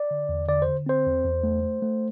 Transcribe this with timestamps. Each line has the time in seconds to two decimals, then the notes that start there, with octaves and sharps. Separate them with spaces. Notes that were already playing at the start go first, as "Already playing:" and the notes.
Already playing: D5
0.11 D3
0.29 E2
0.48 D3 D5
0.62 C5
0.68 D3
0.86 C4 C5
1.06 E2
1.25 E2
1.44 A3
1.63 A3
1.82 A3